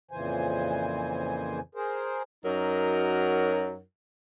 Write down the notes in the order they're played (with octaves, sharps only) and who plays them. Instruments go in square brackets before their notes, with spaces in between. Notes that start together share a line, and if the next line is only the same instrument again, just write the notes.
[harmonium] F2 A#2 C#3 E3 C5 G#5
G#4 A#4 C5
[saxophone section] F#2 F#3 D#4 F#4 A#4